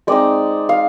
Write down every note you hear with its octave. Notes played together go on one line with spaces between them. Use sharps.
G#3 C4 D#4 D5
F5